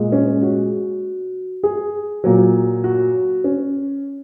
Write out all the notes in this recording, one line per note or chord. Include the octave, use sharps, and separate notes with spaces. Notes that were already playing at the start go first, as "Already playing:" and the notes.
Already playing: A#2 G#3
C#4
F#4
G#4
A#2 F#3
F#4
C#4